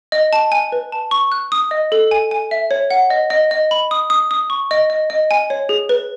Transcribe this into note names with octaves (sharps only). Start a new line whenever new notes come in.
D#5
A5
G#5
B4
A5
C#6
F#6
D#6
D#5
A4
G#5
G#5
E5
C#5
F#5
D#5
D#5
D#5
B5
D#6
D#6
D#6
C#6
D#5
D#5
D#5
G#5
C#5
G#4
B4